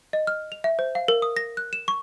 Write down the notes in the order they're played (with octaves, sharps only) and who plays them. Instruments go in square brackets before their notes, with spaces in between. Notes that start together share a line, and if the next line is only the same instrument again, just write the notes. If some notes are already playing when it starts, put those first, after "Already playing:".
[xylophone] D#5
F6
F7
E5
C5
F5
A#4
D#6
A#6
F#6
E7
C#6